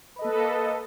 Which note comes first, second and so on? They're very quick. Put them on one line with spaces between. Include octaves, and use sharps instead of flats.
B4 D#5 A4 A#3